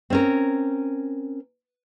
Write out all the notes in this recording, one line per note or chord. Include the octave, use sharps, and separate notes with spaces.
C4 C#4 A#4